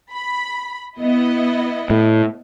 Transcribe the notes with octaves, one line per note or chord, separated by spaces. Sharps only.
B5
B3 E4 D#5
A2